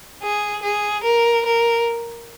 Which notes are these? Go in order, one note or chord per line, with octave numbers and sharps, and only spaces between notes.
G#4
G#4
A#4
A#4